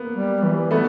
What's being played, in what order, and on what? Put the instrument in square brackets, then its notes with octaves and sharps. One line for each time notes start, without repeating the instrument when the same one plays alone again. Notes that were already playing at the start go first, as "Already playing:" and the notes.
Already playing: [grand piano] A#3 B3
[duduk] G3
E3
[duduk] E3 [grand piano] A3 B3